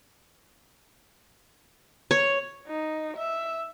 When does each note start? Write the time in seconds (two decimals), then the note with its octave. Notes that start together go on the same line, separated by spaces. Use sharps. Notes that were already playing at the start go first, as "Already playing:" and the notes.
2.11 C#5
2.67 D#4
3.17 E5